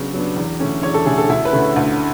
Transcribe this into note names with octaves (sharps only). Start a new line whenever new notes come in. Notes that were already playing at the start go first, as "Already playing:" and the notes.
Already playing: C#3 F#3 B3 D4
F#3 B3 D4
E2
D3 A3 C#4
E2 C#5
A4
D3 A3 C#4 G#4
A4
D2 E4
B4
D3 A3 C#4
D2